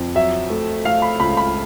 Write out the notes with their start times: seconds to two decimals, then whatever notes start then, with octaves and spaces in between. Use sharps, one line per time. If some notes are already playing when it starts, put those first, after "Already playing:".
Already playing: F2
0.15 F#3 E5
0.50 A3
0.85 A3 F5
1.02 B5
1.20 C#2 B5
1.37 B5